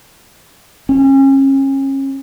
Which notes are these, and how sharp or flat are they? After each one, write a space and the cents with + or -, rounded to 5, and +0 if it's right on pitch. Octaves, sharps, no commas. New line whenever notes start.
C#4 -30